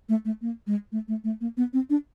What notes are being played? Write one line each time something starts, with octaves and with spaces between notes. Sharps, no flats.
A3
A3
A#3
G#3
A3
A3
A3
A#3
B3
C4
D4